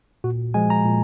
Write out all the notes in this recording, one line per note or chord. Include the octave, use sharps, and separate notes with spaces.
A#2 F#4
F3 G#3 G#5
A#5
A#2